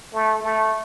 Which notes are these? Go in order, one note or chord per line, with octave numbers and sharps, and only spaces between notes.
A3
A3